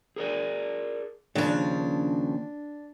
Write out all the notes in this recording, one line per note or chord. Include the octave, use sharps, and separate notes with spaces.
G#4 A#4 D5
D#2 C#3 F3 D4